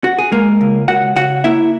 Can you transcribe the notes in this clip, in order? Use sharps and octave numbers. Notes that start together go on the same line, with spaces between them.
F#4
G#4
G#3 A#3 A#4
C#2
C#2 F#4 F#5
C#3 F#4 F#5
A#3 E4 E5